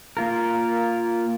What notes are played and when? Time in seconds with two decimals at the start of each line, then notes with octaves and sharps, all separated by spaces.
0.17 A#3 F4 A#4